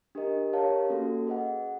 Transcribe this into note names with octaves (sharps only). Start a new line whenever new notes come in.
D4 G4 A#4 D#5
G4 A#4 C#5 F5 A5
A#3 C#4 F#4 A4
G#4 B4 D#5 F#5